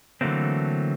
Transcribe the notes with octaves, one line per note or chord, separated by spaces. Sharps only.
D3 E3 F#3 A3 A#3 C4